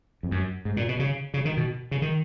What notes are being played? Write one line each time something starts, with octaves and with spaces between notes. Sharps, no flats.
F2
F#2
G#2
A#2
B2
C#3
C#3
D#3
B2
C#3
D#3